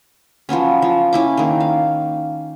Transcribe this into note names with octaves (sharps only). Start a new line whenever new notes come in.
F3 F#3 B3 C#4
F3
C#4 E4 D6
D#3 A#3
F5